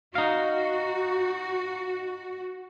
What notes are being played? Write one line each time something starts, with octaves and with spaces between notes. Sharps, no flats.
D#4 F#4 F5